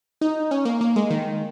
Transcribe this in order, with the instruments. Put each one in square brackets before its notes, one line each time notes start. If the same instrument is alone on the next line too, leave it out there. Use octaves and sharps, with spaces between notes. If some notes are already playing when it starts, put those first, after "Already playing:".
[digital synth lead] D#4
C#4
A#3
A#3
G#3
D#3